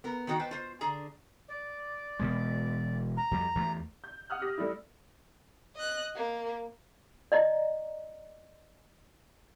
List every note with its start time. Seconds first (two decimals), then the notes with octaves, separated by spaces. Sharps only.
0.04 B3 A#4
0.27 D#3 D#4 F#4 C5 G5
0.39 B4 C5 G5 A5
0.51 F4 C5
0.81 D3 G#4 A#5
1.48 D5
2.19 E1 B2 G#3
3.16 A#5
3.31 F2 G3
3.55 E2 A3
4.04 G6
4.30 F#5 D#6 F6 F#6
4.41 G4 A#6
4.58 G3 A3 E4
5.75 D#5 F#6
6.15 A#3
7.32 D5 D#5 A#5